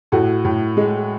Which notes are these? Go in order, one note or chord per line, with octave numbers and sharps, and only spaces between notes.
A2 F#4 A4
A2
G#3